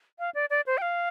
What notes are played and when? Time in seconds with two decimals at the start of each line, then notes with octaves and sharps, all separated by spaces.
0.19 F5
0.35 D5
0.50 D5
0.66 C5
0.78 G5
0.82 F5